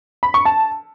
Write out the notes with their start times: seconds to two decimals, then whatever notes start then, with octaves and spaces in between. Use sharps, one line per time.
0.23 B5
0.34 C#6
0.45 A5